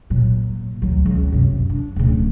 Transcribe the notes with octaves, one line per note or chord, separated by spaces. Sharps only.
A#2 F#3
D2 F#3
C#2
F#2 C3
D4
D1 C#3